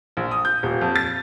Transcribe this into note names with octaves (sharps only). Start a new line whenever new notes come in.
A#1
D#6
G6
D#1
F2
A6